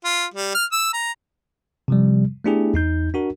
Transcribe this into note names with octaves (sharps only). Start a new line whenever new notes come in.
F4
G3
F6
E6
A#5
C3 F3 G3
A3 B3 D4 E4 G4 G#4
E2 D#4 G6
D4 F#4 A#4